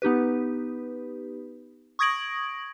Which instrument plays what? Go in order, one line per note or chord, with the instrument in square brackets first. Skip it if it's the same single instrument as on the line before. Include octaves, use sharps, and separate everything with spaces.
[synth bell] B3 D#4 G4 B4
C#6 D#6 G#6 A#6 D7 F#7